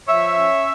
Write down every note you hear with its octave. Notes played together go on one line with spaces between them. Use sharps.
F3 C#5 E5
C#4